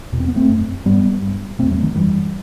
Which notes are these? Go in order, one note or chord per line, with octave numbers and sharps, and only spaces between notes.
E2 B2
C4
B3
A3 C4
F#2
G2 G3 B3
G2
E2 B2 A3 C4
F#3 A3
D#3 F#3
F#2 E3 G3